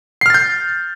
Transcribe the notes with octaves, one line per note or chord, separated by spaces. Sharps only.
F6 G6 A6 C7